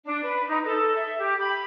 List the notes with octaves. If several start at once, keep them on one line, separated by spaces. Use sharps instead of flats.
D4
B4
D#4
A4
E5
G4
B5